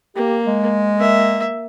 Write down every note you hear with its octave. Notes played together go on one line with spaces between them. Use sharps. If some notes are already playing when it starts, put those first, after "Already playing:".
A#3 G4
G#3
A#3 E5